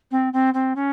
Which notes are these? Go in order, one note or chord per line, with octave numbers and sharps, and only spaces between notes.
C4
C4
C4
C#4